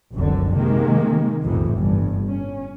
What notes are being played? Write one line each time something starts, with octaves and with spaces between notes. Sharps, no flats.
F1 C2 F#2 D3
C3 D#3 G#3 A#3
B1 F2 A2 C3 E3
G1 G2
C#4